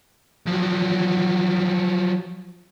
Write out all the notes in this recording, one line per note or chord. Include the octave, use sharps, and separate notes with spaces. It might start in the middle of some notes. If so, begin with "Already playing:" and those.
F3 F#3